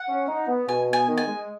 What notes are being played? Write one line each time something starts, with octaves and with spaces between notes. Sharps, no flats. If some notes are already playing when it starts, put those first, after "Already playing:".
Already playing: F#5
C#4
D#4
B3
B2 G#5
B3
G#5
D#3
G#5
G#3